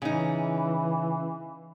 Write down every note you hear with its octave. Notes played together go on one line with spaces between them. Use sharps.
C#3 E3 D#4